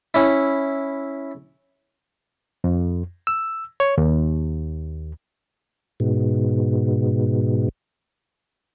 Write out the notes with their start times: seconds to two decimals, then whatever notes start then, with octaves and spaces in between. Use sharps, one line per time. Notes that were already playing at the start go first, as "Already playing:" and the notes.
0.14 C#4 E4
2.64 F2
3.27 E6
3.80 C#5
3.98 D#2
6.00 G#2 B2